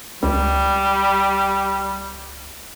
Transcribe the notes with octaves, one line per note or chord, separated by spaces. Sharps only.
C#2 G3